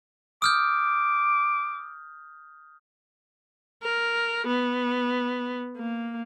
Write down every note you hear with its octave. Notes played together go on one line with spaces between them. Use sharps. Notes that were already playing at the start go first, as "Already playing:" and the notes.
D6 D#6 F6 G6
A#4
B3
A#3